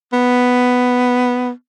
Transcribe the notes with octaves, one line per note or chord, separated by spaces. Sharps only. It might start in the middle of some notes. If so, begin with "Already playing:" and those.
B3